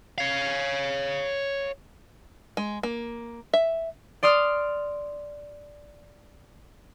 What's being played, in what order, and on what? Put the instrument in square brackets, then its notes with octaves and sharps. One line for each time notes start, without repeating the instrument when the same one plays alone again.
[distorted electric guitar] C#5 F5
[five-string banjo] G#3
A#3
E5
[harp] D5 C6 D#6 F6